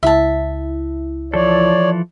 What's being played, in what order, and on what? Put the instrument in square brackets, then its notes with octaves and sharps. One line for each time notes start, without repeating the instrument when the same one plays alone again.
[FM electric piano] C#2 E4 [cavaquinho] E5 A5
[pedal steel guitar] E3 F3 A4 [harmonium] C#5 D5